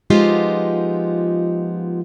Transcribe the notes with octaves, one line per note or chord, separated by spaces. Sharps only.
F3 G#3 B3 D#4 F4 G4